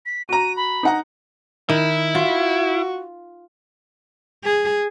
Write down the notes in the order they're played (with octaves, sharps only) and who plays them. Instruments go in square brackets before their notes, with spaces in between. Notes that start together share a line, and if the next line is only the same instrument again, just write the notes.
[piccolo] B6
[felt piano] F#4 A#5 [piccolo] D#7
[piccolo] B5
[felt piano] D#4 F#5 A#5
[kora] D#3 [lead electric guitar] E4
[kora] F4 [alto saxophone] F#4
[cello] G#4